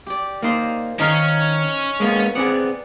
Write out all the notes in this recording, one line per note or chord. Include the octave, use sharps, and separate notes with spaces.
G4 D5
A#3 D#4 C5 D5
D#3 C#4 D#4 A#4 F5
G#3 A#3 B3
B3 C4 G#4 D5 F#5